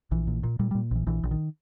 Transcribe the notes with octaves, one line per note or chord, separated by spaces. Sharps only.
A#1 E3
A#2
A#2
A#2 G3
G3
A#2
A#1 E3
A#1 E3
A#1
D#3